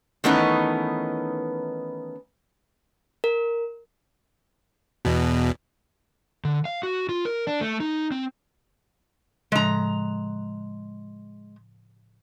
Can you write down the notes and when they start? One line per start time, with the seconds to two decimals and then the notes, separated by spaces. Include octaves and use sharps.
0.24 D#3 E3 A3 B3 C#4 D#4
3.24 A#4
5.05 E2 B2
6.45 D3
6.65 F5
6.83 F#4
7.09 F4
7.25 A#4
7.47 D4
7.61 A3
7.80 D#4
8.12 C4
9.52 A2 C#3 F3 G#3 A#5